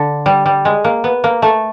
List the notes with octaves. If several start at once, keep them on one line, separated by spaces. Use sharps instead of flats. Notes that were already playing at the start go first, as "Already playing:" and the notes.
Already playing: D3
G3
G3
G#3
A#3
B3
A#3
A3